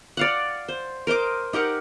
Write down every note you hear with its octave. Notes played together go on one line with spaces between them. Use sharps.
D5 F5 F#5
C5
A#4 C5 D#5 D6
D#4 G4 A#4 F#5